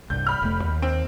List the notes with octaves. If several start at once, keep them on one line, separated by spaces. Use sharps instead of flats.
C2 G2 G6
B5 F6
F1 A3
D#2
C4